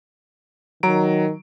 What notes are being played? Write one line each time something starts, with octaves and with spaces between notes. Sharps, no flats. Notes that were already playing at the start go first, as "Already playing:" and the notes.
D#3 F#3 A#5 D7